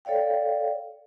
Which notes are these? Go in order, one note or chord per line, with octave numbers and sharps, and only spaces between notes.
A4 C#5 D5 F5 G5